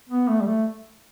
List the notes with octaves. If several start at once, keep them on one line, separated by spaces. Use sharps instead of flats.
B3
A3
G3
A3